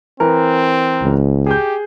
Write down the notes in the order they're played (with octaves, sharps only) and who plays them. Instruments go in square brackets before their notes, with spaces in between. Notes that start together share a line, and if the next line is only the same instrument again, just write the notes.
[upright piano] E3 A#4 [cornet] C4
[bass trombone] C#2
[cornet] G4 [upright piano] G#4 G6